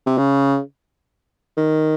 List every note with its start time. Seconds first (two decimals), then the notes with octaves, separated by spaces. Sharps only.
0.07 C3
0.18 C#3
1.57 D#3